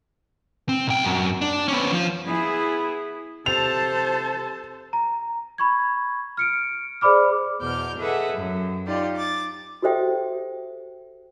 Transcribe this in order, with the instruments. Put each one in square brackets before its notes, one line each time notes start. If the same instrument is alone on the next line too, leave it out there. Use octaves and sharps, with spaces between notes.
[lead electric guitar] C4
B1 G5
F#2
D4
B3 C#4
F3
[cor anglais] B3 [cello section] E4 G#4
[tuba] C3 [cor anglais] A4 [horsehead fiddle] C5 A5 [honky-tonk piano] F7
[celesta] A#5
B5 C#6 G#6
F6 C#7 D7
G#4 C5 D5 B5 D6 F6
[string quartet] E2 B2 D6 F6 G6
G#4 A4 B4 D#5 E5 F#5
F#2
D#4 F4 G4 D5
D6 A6
[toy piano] F#4 G4 A4 C5 E5 G5